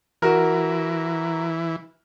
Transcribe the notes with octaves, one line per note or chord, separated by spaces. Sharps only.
E3 F#4 A#4